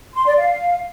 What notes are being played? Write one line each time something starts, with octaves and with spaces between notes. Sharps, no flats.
C6
D5
F5